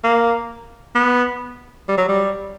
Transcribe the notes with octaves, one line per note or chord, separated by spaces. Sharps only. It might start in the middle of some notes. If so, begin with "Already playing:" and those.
A#3
B3
G3
F#3
G3